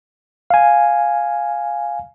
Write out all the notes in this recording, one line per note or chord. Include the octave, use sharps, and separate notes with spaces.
F5 G#5